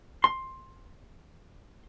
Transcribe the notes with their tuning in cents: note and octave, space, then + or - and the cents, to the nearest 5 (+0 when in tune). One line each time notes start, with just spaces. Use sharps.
C6 +10